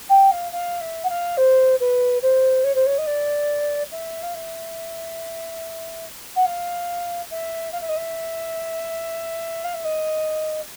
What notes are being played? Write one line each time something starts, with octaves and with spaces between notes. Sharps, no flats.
G5
F5
F5
E5
F#5
F5
C5
B4
C5
C#5
C5
C#5
D#5
D5
E5
F5
E5
F#5
F5
E5
F5
E5
D#5
E5
F5
E5
D#5